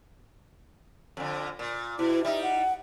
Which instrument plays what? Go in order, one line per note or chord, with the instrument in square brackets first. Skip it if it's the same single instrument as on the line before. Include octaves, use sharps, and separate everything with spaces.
[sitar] F2 D3
A#2
[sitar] B2 [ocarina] E4
[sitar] G3 D#4 [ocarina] E5
[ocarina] F#5